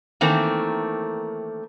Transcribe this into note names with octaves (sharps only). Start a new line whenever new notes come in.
D#3 E3 A3 A#3 C4